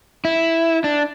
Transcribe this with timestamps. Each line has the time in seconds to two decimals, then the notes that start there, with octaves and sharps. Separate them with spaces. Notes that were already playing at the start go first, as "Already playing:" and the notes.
0.25 E4
0.84 D4